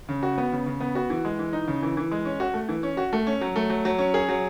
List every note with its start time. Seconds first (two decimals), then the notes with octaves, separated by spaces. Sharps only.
0.09 C#3
0.23 F#4
0.38 B3
0.52 C#3
0.66 C#3
0.80 B3
0.95 F#4
1.10 E3
1.25 G#3
1.39 E3
1.53 D#4
1.68 C#3
1.83 E3
1.97 E3
2.11 G#3
2.25 C#4
2.40 F#4
2.54 A3
2.69 E3
2.83 C#4
2.97 F#4
3.13 A3
3.27 C#4
3.41 F#3
3.56 A3
3.70 F#3
3.85 F#3
3.98 C#4
4.14 G#4
4.29 F#3